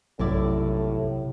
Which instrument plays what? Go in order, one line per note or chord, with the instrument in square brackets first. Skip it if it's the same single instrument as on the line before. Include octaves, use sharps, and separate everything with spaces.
[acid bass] B1 [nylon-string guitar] F#2 E4 D5 [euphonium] A2 [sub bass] C3